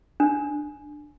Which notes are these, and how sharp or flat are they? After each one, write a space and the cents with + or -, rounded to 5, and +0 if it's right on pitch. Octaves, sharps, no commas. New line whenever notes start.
D4 +10